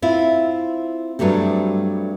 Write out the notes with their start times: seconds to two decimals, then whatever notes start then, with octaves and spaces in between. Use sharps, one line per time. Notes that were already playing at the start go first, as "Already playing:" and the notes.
0.02 C4 E4 F4
1.19 G2 F#3 G3 A3 C4